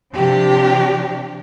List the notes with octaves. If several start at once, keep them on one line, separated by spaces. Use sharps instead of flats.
C3 F3 D4 G4